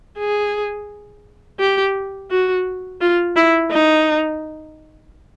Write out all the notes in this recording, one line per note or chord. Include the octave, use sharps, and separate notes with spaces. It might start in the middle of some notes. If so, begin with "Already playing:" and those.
G#4
G4
F#4
F4
E4
D#4